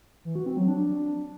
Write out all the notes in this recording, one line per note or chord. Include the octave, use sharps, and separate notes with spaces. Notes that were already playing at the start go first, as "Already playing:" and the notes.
E3
F#4
C4
F#3
D4